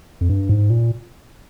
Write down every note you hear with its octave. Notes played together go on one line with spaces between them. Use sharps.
F2
G2
G#2
A#2